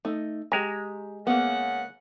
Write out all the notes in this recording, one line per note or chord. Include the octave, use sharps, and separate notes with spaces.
A3 D#4
G#3 G4 G#5 A#5
C#3 A#3 B3 F#5